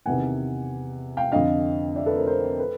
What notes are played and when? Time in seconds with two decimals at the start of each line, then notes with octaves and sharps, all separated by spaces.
0.06 E2 C3 D#3 F#5 G#5
1.17 F5 G5
1.32 F2 D3 D#5 F5
1.96 D5 E5
2.06 A4 B4
2.16 A#4 C5
2.27 A#4 C5
2.59 A4 B4